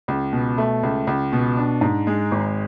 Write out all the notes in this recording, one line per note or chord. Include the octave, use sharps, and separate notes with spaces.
C#2
B2
A3
C#2
C#2
B2
D4
G#2
G#3
G#1